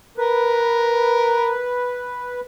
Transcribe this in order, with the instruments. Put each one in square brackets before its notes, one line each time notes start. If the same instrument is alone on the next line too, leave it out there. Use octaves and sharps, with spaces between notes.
[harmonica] A#4 [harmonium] B4